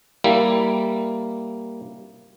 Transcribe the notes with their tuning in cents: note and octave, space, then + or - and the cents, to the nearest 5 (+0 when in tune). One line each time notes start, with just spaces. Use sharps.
G3 +0 A#3 +0 E4 +5